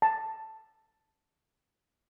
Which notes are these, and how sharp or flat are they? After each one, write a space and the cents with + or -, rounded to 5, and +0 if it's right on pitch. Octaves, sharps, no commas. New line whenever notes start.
A5 +5